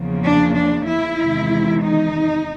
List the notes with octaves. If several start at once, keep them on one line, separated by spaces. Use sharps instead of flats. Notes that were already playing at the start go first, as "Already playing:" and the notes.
Already playing: E2 C#3 F3 A#3
D4
D4
E4
E2 C3 D#3 G#3
D#4